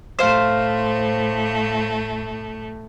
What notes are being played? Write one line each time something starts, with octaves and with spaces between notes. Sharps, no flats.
A2 A3 C5 F5